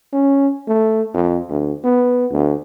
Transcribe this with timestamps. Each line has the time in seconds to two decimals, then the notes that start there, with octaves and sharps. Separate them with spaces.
0.13 C#4
0.67 A3
1.14 F2
1.50 D2
1.84 B3
2.31 D2